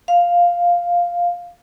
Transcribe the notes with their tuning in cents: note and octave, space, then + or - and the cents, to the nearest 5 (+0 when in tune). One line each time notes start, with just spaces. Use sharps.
F5 +0